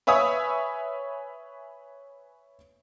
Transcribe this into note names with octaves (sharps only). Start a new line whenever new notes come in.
B4 C#5 E5 G#5 D#6